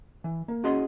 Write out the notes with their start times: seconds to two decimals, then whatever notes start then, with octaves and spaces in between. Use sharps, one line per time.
0.24 E3
0.48 A#3
0.64 C#4 F#4 G#4 D#5 C6